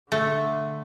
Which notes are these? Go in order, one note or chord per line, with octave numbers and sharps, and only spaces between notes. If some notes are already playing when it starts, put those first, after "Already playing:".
D3 A3